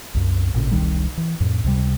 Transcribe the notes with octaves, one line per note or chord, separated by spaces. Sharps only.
C2 F#2
A1 A#2 C#3
E1 C2 D#3 G3
E3
F2 A2
C#2 C3 G3